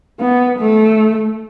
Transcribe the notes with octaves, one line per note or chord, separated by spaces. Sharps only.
B3
A3